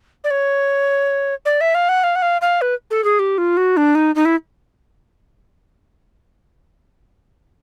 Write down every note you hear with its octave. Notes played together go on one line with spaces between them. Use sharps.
D5
C#5
D5
E5
F5
F#5
F5
F#5
F5
F5
B4
A4
G#4
G4
F4
F#4
D4
D#4
D#4
E4